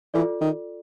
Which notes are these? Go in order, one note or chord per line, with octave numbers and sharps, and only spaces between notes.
E3 F4 A4 D5
D#3